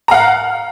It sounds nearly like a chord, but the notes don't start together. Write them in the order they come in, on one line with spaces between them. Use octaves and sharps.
A#5 F5 F#5